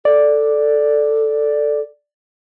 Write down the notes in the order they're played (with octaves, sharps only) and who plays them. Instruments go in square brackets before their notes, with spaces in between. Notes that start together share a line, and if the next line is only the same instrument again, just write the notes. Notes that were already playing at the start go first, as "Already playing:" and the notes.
[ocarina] A4 [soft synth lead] D5